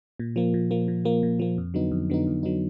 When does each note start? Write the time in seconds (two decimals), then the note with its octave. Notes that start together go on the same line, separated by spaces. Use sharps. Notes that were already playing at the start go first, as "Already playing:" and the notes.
0.19 A#2
0.36 F3 A#3
0.54 A#2
0.71 F3 A#3
0.88 A#2
1.05 F3 A#3
1.23 A#2
1.39 F3 A#3
1.58 F2
1.74 D3 F#3 B3 D#4
1.91 F2
2.10 D3 F#3 B3 D#4
2.27 F2
2.43 D3 F#3 B3 D#4